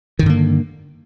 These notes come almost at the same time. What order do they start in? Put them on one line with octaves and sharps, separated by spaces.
D#3 G2 D3 A#3